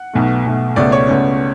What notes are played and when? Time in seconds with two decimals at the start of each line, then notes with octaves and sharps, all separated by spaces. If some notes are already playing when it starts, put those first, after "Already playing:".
Already playing: F#5
0.13 B1 B2 A3
0.46 B1 B2 A3
0.76 C#2 B2 A3 C#4 D5
0.92 C#5
1.08 C#2 B2 A3 C#4